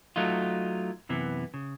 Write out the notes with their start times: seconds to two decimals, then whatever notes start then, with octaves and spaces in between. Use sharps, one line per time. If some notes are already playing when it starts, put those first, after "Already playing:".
0.16 F#3 A3 D#4 F4
1.09 F#2 C3 E3 B3
1.54 C#3